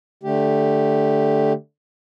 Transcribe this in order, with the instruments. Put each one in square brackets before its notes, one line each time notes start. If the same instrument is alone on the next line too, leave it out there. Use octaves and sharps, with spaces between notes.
[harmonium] D3 A3 G4